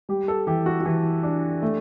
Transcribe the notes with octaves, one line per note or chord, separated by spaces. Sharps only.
G3 G4
A4
E3 G4
F#4
F#4
E3 G4
D4
A3